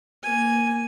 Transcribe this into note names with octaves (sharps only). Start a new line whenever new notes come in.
A#3 G#5